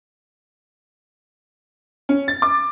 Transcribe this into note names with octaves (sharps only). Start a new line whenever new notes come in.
C#4
A6
D6